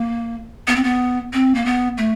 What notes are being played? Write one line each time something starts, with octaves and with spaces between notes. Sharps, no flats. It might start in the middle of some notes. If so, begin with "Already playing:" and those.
Already playing: A#3
B3
C4
B3
C4
A#3
B3
A3